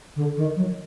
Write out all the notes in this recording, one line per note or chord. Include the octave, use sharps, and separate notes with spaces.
D3
D#3
F#3